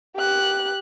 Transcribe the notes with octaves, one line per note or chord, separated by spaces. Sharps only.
G4 F#6